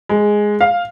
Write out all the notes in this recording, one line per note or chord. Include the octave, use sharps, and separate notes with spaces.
G#3
F5